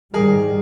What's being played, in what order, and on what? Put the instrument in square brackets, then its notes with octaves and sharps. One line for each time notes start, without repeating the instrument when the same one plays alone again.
[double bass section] G#2 D#3 G3 [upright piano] G#4 A#4